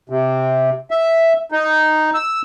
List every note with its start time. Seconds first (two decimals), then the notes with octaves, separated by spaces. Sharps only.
0.10 C3
0.91 E5
1.52 D#4
2.14 E6